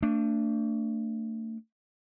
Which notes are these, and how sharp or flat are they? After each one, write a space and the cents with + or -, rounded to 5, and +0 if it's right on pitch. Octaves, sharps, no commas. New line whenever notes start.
A3 +40 D4 +0